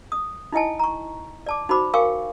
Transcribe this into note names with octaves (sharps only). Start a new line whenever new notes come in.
D#6
D#4 E4 D#5 G#5 A5
A#5 C#6
D5 A5 D6
D#4 F#4 C5 B5 D6
A#4 F5 G5 G#5 C#6 D6